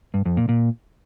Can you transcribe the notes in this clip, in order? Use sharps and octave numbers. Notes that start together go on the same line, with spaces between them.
G2
F2
A#2
A#2